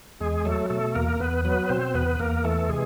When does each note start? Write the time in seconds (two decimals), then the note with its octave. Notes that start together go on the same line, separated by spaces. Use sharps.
0.20 E2 G#3 G#4
0.45 F#3 A3 A4
0.70 B2 A3 A4
0.95 E2 A#3 A#4
1.20 E2 B3 B4
1.45 F#3 B3 B4
1.69 B2 C4 C5
1.94 E2 B3 B4
2.20 E2 A#3 A#4
2.44 E3 A3 A4
2.69 C3 G#3 G#4